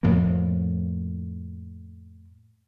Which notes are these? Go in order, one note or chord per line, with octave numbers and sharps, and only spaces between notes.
F2 A2 F3 A#3